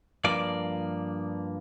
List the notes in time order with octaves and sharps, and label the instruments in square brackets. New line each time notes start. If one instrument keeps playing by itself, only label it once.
[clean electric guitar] G2 F3 A#3 D5